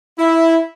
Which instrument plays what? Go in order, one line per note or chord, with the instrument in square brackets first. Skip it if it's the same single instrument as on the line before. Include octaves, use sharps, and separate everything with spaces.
[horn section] E4